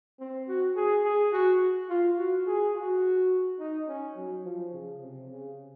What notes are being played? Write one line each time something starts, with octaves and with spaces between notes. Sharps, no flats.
C4
F#4
G#4
G#4
F#4
F4
F#4
G#4
F#4
D#4
C#4
F#3
F3
C#3
C3
C#3